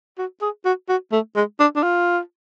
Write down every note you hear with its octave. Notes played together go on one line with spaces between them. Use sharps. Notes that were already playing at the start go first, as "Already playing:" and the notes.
F#4
G#4
F#4
F#4
A3
G#3
D4
D4
F4